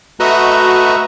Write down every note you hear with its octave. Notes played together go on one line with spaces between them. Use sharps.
A3 F#4 B4 D#5 E5 A#5